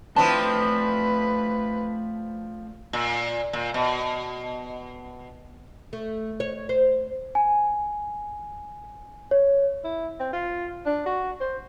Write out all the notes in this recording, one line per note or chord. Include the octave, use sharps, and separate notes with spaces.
F3 A3 C4 D4 E4 B4 A5 C6
A#2
A#2
B2
A3
C#5
C5
G#5
C#5
E4
C4
F4
D4
F#4
C5